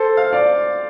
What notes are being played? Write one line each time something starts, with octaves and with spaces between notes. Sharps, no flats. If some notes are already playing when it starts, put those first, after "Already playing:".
Already playing: A4 C5
F5
D5 F5